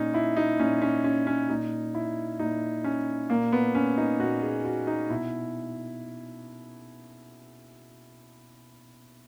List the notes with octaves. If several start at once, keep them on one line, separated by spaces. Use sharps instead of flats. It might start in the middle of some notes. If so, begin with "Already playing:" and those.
Already playing: A#2 C#4 D#4
E4
D#4
A#2 C#4
C#4
C#4
C#4
A#2 D#4
E4
A#2 D#4
C#4
A#2 A#3
B3
C#4
D#4
A#2 F#4
G#4
F#4
D#4
B2 E4